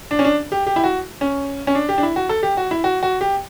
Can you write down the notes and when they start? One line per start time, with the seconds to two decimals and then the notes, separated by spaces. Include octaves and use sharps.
0.11 D4
0.19 C#4
0.25 D4
0.52 G4
0.67 G4
0.76 E4
0.84 F#4
1.21 C#4
1.67 C#4
1.75 D4
1.89 G4
1.98 D4
2.03 E4
2.16 F#4
2.29 A4
2.43 G4
2.57 F#4
2.71 E4
2.84 F#4
3.03 F#4
3.21 G4